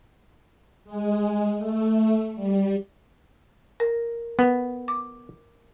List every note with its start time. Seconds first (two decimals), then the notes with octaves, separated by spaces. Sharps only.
0.85 G#3
1.57 A3
2.35 G3
3.80 A#4
4.39 B3
4.88 D6